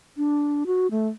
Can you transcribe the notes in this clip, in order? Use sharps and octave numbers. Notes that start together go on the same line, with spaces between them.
D4
F#4
A3